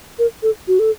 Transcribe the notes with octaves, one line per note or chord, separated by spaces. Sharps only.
A#4
A4
F#4
A4